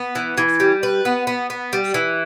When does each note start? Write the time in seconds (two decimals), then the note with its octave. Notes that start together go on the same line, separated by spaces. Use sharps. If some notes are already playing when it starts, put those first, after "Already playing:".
Already playing: B3
0.15 E3
0.38 E3
0.60 G3
0.83 B4
1.05 B3
1.27 B3
1.50 B3
1.73 G3
1.94 E3